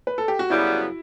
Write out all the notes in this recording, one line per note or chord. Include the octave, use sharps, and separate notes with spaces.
B4
A4
G4
F#4
F#2 C#3 G3 B3 E4